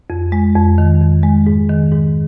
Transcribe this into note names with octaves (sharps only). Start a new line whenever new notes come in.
F2
G#3
F2
D#3
F2
G#3
G#2
D#3
G#2